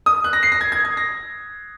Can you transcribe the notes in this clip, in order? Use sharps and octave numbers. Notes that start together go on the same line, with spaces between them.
D#6
F#6
A#6
C7
A#6
G#6
G#6
G#6
A#6